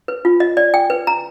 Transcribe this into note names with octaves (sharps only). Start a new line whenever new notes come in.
B4
F4
D#5
D5
G5
B4
A#5